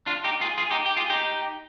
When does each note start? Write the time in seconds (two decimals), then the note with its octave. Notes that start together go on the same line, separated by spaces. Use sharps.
0.06 D4 F4
0.24 D#4 G4
0.41 F4 G#4
0.58 F4 G#4
0.71 D#4 G4
0.86 G4
0.97 F4 G#4
1.10 D#4 G4